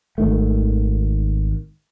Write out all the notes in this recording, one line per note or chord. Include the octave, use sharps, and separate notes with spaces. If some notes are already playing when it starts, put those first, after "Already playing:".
G#1 D#3 A3